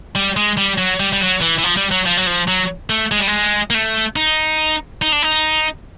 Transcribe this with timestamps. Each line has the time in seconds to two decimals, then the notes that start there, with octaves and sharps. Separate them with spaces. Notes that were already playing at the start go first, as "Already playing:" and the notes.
0.15 G3
0.37 G#3
0.57 G3
0.78 F#3
1.00 G3
1.13 G3
1.21 F#3
1.41 E3
1.58 E3
1.63 F3
1.77 G3
1.91 F#3
2.06 F3
2.17 F#3
2.27 F3
2.48 F#3
2.90 A3
3.11 G#3
3.19 G3
3.27 G#3
3.70 A#3
3.74 A3
4.16 D#4
5.02 D#4
5.12 D4
5.23 D#4